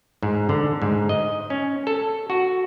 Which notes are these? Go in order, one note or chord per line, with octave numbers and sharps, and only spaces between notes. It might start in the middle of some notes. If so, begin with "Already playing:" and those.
G#2
D3
G#2
D#5
C#4
A4
F#4